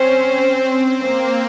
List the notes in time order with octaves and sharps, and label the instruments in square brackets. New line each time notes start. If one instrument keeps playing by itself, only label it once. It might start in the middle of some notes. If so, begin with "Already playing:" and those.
Already playing: [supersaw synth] C4 C#4 [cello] C5
[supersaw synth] C4
[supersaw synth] A#3 [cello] C5